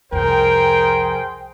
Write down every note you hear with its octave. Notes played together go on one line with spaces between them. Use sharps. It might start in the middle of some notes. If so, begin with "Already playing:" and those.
C2 F2 G#4 A#4 C5 G5